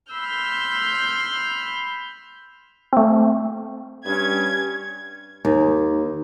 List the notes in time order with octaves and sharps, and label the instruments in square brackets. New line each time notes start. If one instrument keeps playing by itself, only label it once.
[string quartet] B5 C6 E6 F6 G6
[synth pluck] A3 C4
[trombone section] G2 C#4 [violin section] G#6
[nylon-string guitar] D#2